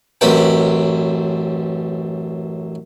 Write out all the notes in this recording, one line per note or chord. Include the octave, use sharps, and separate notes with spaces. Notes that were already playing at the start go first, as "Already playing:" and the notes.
A1 F#2 C4 B4 G5